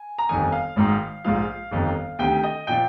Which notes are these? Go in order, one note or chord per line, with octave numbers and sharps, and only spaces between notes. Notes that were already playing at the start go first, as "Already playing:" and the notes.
Already playing: G#5
A#5
G1 F2 D#3 G#5
F5
G#1 G#2 D#3
A#1 G#2 F3 F5
G1 F2 D#3
D2 C3 D#3 G5
D#5
A#2 F3 G5